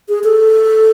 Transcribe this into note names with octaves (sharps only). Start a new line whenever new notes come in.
G#4
A4